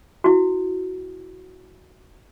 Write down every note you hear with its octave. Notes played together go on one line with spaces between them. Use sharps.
E4 F#4